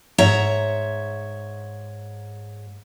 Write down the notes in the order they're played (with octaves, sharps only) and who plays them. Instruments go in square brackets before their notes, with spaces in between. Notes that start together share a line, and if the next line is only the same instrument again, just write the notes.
[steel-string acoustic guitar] G#2 C#5 E5 A#5